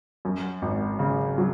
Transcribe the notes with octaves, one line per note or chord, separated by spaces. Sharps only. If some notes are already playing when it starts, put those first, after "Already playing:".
F#2
G#1
C#3
F#3